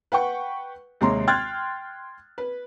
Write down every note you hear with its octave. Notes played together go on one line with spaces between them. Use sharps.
B4 F#5 G5 C#6
D#2 C3 G#3 C#5 A#5 C6
G5 C6 F6 F#6 G#6 A6
B4